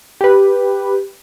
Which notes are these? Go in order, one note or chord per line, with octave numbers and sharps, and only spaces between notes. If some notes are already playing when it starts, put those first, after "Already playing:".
G4 B4